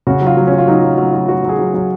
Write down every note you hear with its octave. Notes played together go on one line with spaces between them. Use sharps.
C#3 F#4
F#3
F4
F#3
C#4
F#3
F4
F#3 D#4
F#3
F#3
F#3
F#3 F#4
F#3
G#4
F#3
F#3